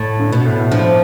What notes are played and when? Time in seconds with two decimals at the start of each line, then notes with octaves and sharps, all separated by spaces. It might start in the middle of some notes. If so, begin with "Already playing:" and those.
Already playing: A2
0.19 D3
0.32 B2
0.45 A2
0.71 G2 F3